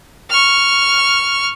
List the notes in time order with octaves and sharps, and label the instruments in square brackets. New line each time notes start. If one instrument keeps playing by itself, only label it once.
[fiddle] C#6 F6